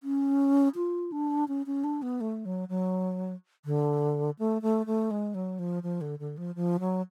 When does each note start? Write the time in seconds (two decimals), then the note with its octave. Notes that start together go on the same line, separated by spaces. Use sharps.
0.03 C#4
0.76 F4
1.12 D4
1.48 C#4
1.66 C#4
1.84 D4
2.02 B3
2.21 A3
2.45 F#3
2.69 F#3
3.65 D3
4.39 A3
4.62 A3
4.86 A3
5.11 G#3
5.35 F#3
5.59 F3
5.83 F3
6.01 D3
6.19 D3
6.38 F3
6.55 F3
6.80 F#3